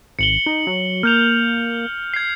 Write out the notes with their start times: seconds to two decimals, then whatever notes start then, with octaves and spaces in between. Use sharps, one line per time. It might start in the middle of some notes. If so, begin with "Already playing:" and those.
0.19 G#1 C#7 F#7 G7
0.46 D#4
0.67 F#3
1.03 A#3 F6 G6 F7
2.14 G#6 C7